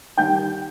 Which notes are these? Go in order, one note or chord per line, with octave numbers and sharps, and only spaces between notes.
D#3 G3 D#4 G5 G6